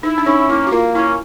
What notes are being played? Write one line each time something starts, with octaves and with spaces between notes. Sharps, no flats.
D#4 E4
D4
C#4 D#4
A#3 E4
F#4
A#3 F4
C#4 E4